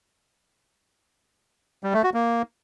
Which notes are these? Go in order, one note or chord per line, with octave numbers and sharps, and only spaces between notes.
G3
A3
F#4
A#3